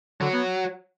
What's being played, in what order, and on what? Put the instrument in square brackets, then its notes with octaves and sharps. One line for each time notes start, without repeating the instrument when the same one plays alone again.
[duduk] D3 [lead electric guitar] F#3
[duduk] B3